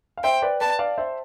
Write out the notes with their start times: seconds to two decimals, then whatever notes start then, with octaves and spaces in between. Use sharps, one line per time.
0.17 F5
0.24 C5 E5 G5
0.42 B4 D5
0.61 B4 D5 A5
0.79 D5 F5
0.98 C5 E5